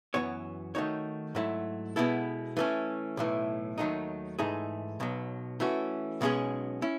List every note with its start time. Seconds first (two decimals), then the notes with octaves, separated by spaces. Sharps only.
0.14 F#2 E3 B3 F#4 C#5
0.75 D#3 A3 D#4 F#4 C#5
1.35 G#2 F#3 A3 E4
1.96 B2 G#3 B3 E4 A4
2.57 E3 A3 C#4
3.17 B1 A2 E3 A3
3.78 D#2 D#3 F#3 A3 D#4
4.39 G#2 E3 A3 D#4 G#4
5.00 B1 B2 F#3
5.60 E3 A3 C#4 F#4
6.21 B1 B2 G#3 C#4 G#4
6.82 C#4 E4